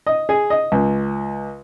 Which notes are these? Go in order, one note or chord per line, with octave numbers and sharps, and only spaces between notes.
D#5
G#4
D#5
C#2